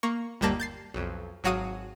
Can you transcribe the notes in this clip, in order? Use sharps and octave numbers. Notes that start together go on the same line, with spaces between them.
A#3 C#6
G1 D#2 G3 A#3 A5 A#6
G6 A6 C7
B1 F2
G#1 F#3 F#4 F5 D#6 D#7